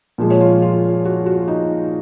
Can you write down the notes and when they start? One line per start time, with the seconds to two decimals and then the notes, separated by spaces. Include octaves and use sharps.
0.18 A#2 F3 G#3
0.30 C#5
0.41 F4
0.62 F4
1.05 F#4
1.26 F#4
1.48 D#4